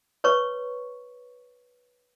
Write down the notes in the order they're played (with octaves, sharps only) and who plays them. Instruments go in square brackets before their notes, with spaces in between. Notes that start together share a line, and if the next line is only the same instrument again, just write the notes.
[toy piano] B4 C#5 C#6